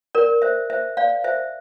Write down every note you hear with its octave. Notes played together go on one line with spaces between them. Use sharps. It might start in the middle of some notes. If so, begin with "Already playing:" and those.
A#4 D5
C5 E5
C5 E5
D5 F5
C5 E5